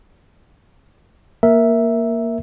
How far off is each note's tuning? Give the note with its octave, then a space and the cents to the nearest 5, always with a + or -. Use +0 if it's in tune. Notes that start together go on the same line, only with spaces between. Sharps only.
A#3 +0 A#4 +5 E5 +0